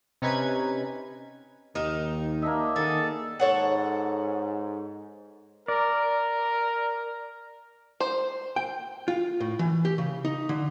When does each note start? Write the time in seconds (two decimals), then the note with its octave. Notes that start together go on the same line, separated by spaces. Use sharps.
0.22 C3 C#4 D#4 B4 G#6
1.75 D#2 D#3 D#4
2.42 A#3 D4 D#5 E5
2.76 D#3 G#4 A4 F#5 G5
3.40 G#2 A4 C#5 F#5
5.68 A#4 D5
8.00 C5
8.56 G5
9.08 F4
9.40 A2
9.59 E3
9.85 G4
9.98 C#3
10.25 D#4
10.49 D3